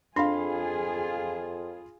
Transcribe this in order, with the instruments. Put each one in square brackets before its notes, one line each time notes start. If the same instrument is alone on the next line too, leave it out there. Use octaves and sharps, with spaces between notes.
[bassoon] F2 [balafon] D4 [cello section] F4 G#4 [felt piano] F5 B5 C6